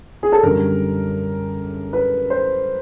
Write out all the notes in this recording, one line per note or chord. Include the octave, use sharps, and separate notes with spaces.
G#4
A4
F#2 D3 G3 A#4
B4
C5